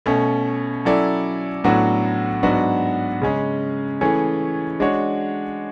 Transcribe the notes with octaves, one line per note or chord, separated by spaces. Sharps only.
B2 A3 C#4
F#3 C#4 E4 A4 D5
A2 F#3 B3 D4 F#4
G#2 F#3 B3 D4 F#4
C#3 G#3 C#4
E3 A3 C#4 G#4 C#5
G#3 D4 F#4 C#5